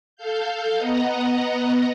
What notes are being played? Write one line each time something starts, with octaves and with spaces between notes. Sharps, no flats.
A4 F5 G6
B3 D#5 F#5 A#5